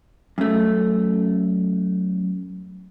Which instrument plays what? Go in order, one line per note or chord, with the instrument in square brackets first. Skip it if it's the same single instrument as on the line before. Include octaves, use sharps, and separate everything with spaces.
[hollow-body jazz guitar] F#2 A3